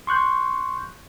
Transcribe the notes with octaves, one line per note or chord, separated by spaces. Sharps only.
C6 C#6 F#6 G6